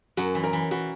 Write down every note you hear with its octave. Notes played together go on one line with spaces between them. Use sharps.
F#2 F#4
E3
A#4
E3
E3 F#4